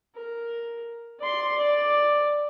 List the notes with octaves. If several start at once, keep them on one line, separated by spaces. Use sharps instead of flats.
A#4
D5 C6
D5